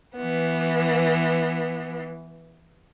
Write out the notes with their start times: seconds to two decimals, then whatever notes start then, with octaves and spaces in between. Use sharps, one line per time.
0.16 E3 B3